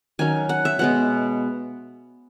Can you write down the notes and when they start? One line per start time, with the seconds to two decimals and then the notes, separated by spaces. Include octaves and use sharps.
0.19 D#3 F#3 C#4 G#5
0.49 F#5
0.65 E5
0.79 B2 G#3 B3 F#5